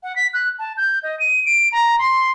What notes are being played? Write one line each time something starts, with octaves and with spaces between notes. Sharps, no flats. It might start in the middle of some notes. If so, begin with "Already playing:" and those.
F#5
B6
F#6
A5
G6
D#5
D#7
D7
A#5
C6